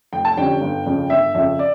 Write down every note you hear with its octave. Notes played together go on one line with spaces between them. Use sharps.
F1 G5
A5
F2 D3 G3 C#4 G5
G1
F2 C#3
G1 E5
F2 C#3 E5
D5